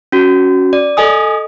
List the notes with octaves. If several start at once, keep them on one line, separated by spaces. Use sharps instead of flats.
C#4 F#4
D5
A4 D#5 G#5 D#6